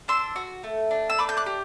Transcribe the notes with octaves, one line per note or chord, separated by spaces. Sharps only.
D4 C6 E6
F#4
A3
D4
E6
A3 B5 D6
G6
D6 F#6
G4